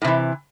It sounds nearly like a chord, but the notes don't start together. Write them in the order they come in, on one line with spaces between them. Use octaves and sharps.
A2 C3 E3